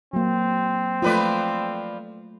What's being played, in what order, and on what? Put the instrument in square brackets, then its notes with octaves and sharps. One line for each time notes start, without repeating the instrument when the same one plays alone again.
[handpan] F#3 A#3 [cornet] C4
[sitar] F3 B4 D5 [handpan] A3 F4